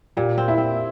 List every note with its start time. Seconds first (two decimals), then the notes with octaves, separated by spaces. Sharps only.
0.17 A#2 G4
0.38 C4
0.48 E4
0.58 C4